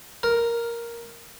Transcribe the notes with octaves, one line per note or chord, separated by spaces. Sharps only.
A#4